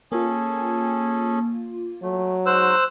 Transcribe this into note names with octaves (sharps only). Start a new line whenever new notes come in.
A#3 C#4 F4 G#4 A4
F#3 A3
G#3 D#4 F#4 C5 E6 F#6